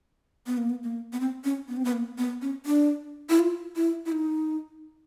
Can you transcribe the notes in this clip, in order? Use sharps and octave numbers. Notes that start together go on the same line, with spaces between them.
B3
A#3
B3
A#3
B3
C4
C#4
B3
C4
B3
A#3
B3
C#4
D4
E4
F4
E4
E4
D#4